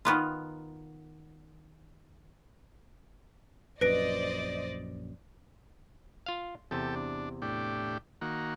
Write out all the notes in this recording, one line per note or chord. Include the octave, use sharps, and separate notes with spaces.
D#3 B3 F4
A#1 F#2 B4 C5 D5 D#5 A#6 D7
F4 F5
E2 C3 G4 A4
D4
A2 D4 G4
D#3 A#3 F#4